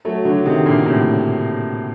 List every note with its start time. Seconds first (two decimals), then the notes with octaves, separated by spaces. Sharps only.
0.05 F#3 A3
0.25 D3 F#3
0.45 C3 D#3
0.66 A#2 D3
0.86 A2 C3